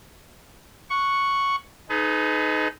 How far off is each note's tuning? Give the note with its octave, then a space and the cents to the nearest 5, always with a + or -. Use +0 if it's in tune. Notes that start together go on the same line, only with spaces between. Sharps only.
F#5 -5 C#6 +0
D#4 +0 G#4 +45 B4 +35